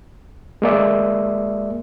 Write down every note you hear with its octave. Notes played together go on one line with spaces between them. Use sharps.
G#3 A#3 D5 E5